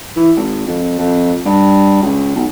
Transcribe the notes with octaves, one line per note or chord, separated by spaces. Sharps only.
E3
G#1
F2
F2
G2
C#2
B1